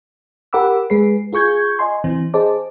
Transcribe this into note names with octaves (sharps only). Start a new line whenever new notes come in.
G4 A#4 F#5 B5 D6 E6
G#3 G#4 B4 C7
F4 G#4 C#6 G6 G#6
D#5 G#5 C6
E3 C4
G#4 C5 D#5 A5 D6